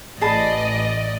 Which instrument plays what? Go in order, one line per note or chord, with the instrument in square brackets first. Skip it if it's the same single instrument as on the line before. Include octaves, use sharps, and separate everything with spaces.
[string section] A1 D5 D#5 [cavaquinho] G#4 A5 B5